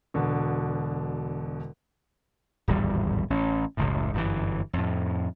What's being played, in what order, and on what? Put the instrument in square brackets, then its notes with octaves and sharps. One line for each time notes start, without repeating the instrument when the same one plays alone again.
[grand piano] E1 B2 D3
[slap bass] D1 G#1 E2 G3
A1 C#4
F#1 C#2 A2
G1 F#2 C3 E3
F2 A2